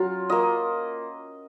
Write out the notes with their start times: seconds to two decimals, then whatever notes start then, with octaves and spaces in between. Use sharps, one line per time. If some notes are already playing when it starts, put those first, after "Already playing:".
Already playing: F#3 C#4 F4
0.30 A#3 F4 D#5